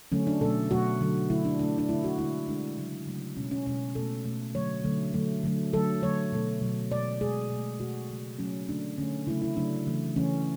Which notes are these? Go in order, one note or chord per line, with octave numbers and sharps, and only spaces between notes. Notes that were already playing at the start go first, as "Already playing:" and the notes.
D3 F#3 A3 C#4
D4
B2 F#3 A3 A4
B2 F#3 A3 F#4
D3 F#3 A3
D3 F#3 A3 E4
D4
D3 A3 D4
D4
D3 A3 E4
F#4
D3 G#3 E4
D3 G#3 D4
C#3 F#3 A3
C#3 F#3 A3
B2 G#3 C#4
C#4
B2 G#3 C#4
B2 A3 A4
B2 A3
D3 F#3 A3 C#5
D3 F#3 A3
D3 F#3 A3
D3 F#3 A3
D3 F#3 A3 A4
D3 F#3 A3 C#5
B2 F#3 A3
B2 F#3 A3
B2 G#3 D5
B2 G#3 G#4
B2 A3
B2 A3 F#4
C#3 F#3 A3
C#3 F#3 A3 C#4
D3 A3 D4
D3 A3 C#4
C#3 F#3 A3 E4
E4
C#3 F#3 A3 D4
C#3 E3 A3
C#3 E3 A3 C#4